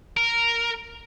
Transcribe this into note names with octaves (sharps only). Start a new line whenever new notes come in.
A#4